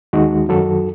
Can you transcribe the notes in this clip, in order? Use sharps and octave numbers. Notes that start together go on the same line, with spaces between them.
D#2 D#3 G#3 D#4 F#4
F#2 D#3 F#3 F#4 A4